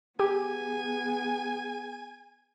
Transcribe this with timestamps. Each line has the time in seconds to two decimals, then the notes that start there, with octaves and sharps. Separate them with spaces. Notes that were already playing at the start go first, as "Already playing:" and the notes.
0.19 B3 G4 G#4 G#5